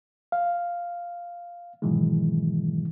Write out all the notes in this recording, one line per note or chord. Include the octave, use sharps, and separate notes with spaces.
F5
G#2 B2 D#3 E3 F#3 G#3